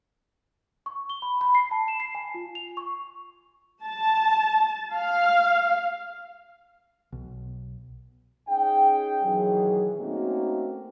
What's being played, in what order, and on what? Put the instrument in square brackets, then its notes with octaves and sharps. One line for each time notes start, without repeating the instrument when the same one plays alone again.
[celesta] C#6
G7
B5
B5
C7
A5
E7
C7
G#5
F4
F7
C#6
[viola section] A5
F5
[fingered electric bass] B1
[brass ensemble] C#4 D#4 G#4 G5
B2 D#3 E3 F#3 G#4
A3 A#3 C4 C#4 D#4 F#4